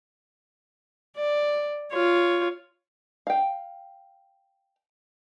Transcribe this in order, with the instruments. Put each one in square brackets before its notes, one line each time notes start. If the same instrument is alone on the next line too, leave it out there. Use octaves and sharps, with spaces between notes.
[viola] D5
F4 C#5
[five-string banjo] F5 G5